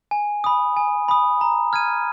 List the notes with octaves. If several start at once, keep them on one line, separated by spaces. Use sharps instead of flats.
G#5
B5 D#6
G#5
B5 D#6
A#5
F6 G#6 D#7